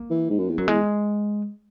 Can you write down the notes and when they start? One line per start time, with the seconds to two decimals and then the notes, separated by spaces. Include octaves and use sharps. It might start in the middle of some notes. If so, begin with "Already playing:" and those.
Already playing: A#3
0.10 E3
0.30 G#2
0.38 F#2
0.49 E2
0.58 F#2 F#3
0.68 E2 G#3